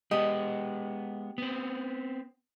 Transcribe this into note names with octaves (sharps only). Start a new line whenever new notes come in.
G#3 B3 G4 D#5
B3 C4